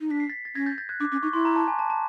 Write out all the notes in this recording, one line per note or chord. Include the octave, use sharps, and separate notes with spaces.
D#4
D4 B6
C7
A6 B6
A6
C#4 G#6 A#6
G6 A6
G6 A6
F#6 G#6
D4 D6
C#4 D6
D#4 C#6
E4 C6
A#5
A5
G#5
A5
A5